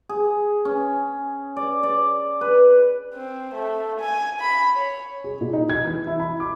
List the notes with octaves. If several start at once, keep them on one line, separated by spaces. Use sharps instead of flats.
G#4
C#4
D5
D5
B4
C4
A3
G#5
B5
C#5
G#4
A#2
D#4
G#6
E3
E4
B5
D6